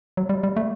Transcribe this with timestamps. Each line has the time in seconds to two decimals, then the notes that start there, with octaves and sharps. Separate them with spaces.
0.17 F#3
0.29 G3
0.43 G3
0.57 A3